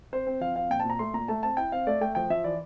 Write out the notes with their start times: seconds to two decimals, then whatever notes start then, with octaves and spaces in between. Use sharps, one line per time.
0.13 C4 C5
0.27 C4
0.41 F3 F5
0.55 C4 F5
0.70 A#2 G5
0.80 A5
0.85 A#2 A#5
0.99 A3 C6
1.14 A#2 A#5
1.28 A3 A5
1.43 C4 A5
1.57 E4 G5
1.72 C4 F5
1.87 A3 D5
2.01 A3 G5
2.15 F3 G5
2.30 F3 E5
2.44 E3 D5